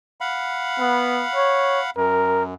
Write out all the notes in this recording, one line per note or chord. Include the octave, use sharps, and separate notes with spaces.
F5 F#5 B5
B3
C#5
F#2 A#4